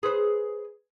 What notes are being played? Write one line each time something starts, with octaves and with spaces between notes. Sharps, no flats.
G#4 B4 C5